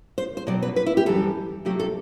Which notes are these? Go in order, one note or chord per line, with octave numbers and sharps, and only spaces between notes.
C5
C5
B2 F#3 C4 D5
B4
B4
E4
G4
F#2 E3 G3 A4
C3 F#3 A3 G4
A4